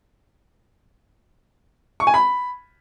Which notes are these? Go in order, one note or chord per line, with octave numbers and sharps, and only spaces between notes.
C#6
G#5
B5